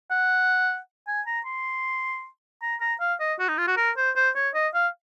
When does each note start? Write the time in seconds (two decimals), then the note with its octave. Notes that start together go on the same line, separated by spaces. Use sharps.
0.10 F#5
1.07 G#5
1.27 A#5
1.45 C6
2.62 A#5
2.80 A#5
3.00 F5
3.20 D#5
3.39 F#4
3.48 D#4
3.58 F4
3.67 F#4
3.77 A#4
3.97 C5
4.16 C5
4.35 C#5
4.54 D#5
4.74 F5